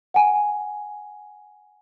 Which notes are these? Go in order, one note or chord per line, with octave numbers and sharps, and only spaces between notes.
F#5 G#5